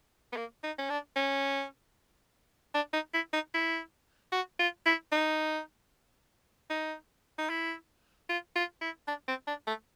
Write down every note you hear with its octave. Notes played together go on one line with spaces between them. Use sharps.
B3
A#3
D#4
C#4
D4
C#4
D4
D#4
E4
D#4
E4
F#4
F4
E4
D#4
D#4
D#4
E4
F4
F4
E4
D4
C4
D4
A3